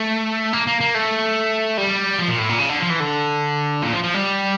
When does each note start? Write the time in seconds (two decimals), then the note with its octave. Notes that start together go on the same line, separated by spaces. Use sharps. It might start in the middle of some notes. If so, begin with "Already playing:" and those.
Already playing: A3
0.53 A#3
0.67 A#3
0.80 A#3
0.95 A3
1.78 G3
2.19 F3
2.28 A#2
2.39 A2
2.49 A#2
2.59 C#3
2.69 D3
2.80 F3
2.90 E3
3.00 D3
3.82 A#2
3.93 F3
4.04 F3
4.14 G3